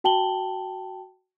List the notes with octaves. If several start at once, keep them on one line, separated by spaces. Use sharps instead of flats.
F#4 G5 A5 F#7 G7